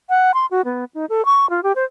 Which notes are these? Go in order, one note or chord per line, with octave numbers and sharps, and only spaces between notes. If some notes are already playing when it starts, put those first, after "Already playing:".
F#5
C6
F#4
B3
D#4
A4
C#6
F4
G4
C5